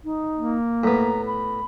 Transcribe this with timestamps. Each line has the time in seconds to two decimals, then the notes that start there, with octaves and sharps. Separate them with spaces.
0.04 D#4
0.35 A#3
0.83 A2 B3 A#5
1.27 B5